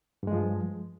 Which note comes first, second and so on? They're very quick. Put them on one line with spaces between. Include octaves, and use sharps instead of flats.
G2 G#3 F3